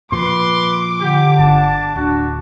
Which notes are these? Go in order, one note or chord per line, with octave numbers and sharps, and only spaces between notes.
A#2 F3 B4 C6 D6
D3 G4
G1 D4 A5
D1 D4 F#4